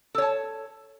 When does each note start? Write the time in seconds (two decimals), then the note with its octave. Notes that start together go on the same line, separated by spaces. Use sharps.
0.15 A4
0.18 C#5
0.22 A5